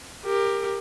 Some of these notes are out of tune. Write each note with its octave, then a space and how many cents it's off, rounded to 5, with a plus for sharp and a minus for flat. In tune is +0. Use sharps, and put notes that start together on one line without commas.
G4 +20 A#4 +0